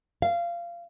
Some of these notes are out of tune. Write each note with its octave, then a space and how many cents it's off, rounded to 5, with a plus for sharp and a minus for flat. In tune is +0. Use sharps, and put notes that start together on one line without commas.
F5 -20